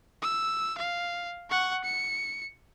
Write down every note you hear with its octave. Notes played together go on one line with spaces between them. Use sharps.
E6
F5
F#5 C#6
C#7